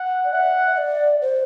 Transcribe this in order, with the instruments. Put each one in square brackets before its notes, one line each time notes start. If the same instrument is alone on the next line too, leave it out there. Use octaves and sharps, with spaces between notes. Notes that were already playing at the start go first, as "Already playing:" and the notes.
Already playing: [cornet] F#5
[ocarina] D5
[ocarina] E5 [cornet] F#5
[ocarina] E5
D5
C5